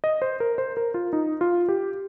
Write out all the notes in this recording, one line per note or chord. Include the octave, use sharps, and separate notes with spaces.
D#5
C5
A#4
C5
A#4
F4
D#4
F4
G4